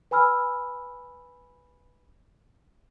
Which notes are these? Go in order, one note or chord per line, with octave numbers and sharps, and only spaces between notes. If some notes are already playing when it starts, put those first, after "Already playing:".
B4 G#5 B5 E6 F6